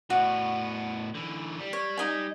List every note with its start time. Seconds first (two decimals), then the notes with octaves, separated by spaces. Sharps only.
0.10 A2 B3 F#4 D5
1.14 D3 E3
1.59 G3
1.73 C#5
1.98 D#4 D#5 G#5